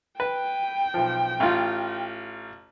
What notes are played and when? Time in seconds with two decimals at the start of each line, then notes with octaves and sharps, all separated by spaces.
0.20 B4 G5
0.94 B1 F3
1.40 A1 F4